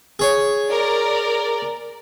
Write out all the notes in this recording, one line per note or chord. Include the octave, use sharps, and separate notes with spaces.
G#4 C#5
A#4 D5